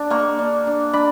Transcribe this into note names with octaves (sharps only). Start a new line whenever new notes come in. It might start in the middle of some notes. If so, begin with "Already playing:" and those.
Already playing: D4
A#3 C#6
D4
D4
D4 B5